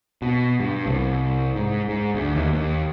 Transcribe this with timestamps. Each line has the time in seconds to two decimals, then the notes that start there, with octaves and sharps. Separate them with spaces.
0.22 B2
0.60 G2
0.86 C2
1.55 G#2
1.89 G#2
2.14 D2
2.35 D#2
2.53 D#2